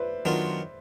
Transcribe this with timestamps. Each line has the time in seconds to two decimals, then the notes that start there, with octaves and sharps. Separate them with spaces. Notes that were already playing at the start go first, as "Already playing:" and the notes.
Already playing: B4 C5 D5 E5
0.25 D#3 F#3 B3 D4 F4